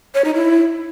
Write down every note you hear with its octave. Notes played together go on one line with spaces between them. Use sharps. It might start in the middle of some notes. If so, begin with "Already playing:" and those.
C#5
D#4
E4